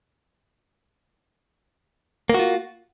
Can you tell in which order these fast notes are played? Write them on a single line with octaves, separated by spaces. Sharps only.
A#3 F#4 F4